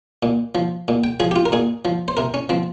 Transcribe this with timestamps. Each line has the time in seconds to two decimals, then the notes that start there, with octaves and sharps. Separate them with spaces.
0.23 A#2
0.55 F3
0.88 A#2
1.04 G5
1.20 F3 G#4
1.31 G4
1.36 F4
1.46 A#4
1.52 A#2 G#4
1.85 F3
2.08 C5
2.17 C3 A#4
2.34 C#4
2.49 F3 C4